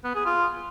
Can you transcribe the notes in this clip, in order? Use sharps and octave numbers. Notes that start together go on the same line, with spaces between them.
B3
G#4
F4